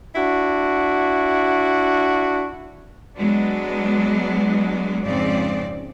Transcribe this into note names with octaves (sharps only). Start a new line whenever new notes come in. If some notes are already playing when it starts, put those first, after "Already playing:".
D4 E4 F#4
F#3 G#3 B3 D4
F2 G#2 C#3 C4 D5